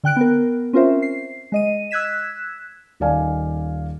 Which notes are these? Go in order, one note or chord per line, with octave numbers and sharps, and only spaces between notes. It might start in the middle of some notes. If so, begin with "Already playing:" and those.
D3 G5 F#6 D7
B3 A#4
C4 C#4 F4 A#4 C5 E5
C7
G#3 D#5 D#7
E6 F#6 G#6 B6 E7
D#1 D#3 D5 F5 G#5